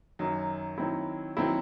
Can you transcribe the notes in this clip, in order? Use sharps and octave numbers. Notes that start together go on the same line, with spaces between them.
F#2 D#3 F#3
D#3 F#3 C4 E4
D#3 F#3 C4 E4